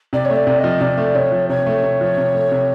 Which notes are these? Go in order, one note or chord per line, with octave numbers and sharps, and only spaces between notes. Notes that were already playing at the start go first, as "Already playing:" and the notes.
C3 D5
C#5
A3
D5
C3
D#5
F3
C3 D5
A3
C3 C#5
F3
C3 C#5
A3
C3
F3
C3
A3
C3